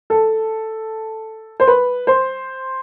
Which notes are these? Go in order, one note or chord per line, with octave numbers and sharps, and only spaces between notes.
A4
C5
B4
C5